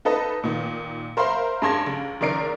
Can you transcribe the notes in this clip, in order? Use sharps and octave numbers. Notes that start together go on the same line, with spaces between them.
D#4 A4 B4 D#5 A5
A#2 D#3
A#4 C5 E5 F5 B5 C6
G2 G#4 A5 C6 G#6 A#6
C#2
F#1 D#3 A#4 D5 C7 D7